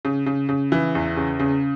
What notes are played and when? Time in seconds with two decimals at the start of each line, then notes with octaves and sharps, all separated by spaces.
0.05 C#3
0.26 C#3
0.49 C#3
0.72 E3
0.95 E2
1.17 C#3
1.40 C#3